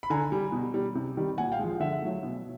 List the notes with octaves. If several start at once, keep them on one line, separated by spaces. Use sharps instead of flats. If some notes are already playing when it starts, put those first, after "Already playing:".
B5
D3 G#5 A#5
G3
B2
G3
C3
D#3 G3
A#2 F#5 G#5
F5 G5
F3 G#3
D3 E5 F#5
F#3 A3
B2